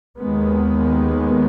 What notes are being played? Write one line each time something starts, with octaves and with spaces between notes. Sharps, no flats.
D#2 D#3 G#3 B3